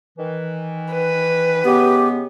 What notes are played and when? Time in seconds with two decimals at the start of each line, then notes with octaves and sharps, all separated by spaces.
0.18 D#3 E3
0.93 B4
1.65 C#3 G#3 B3 G4